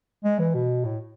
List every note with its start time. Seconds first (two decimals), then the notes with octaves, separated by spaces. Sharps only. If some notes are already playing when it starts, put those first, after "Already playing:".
0.24 G#3
0.39 E3
0.54 B2
0.85 A2